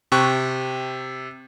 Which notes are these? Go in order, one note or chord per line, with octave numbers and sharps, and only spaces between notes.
C3 G5 C#6 F#6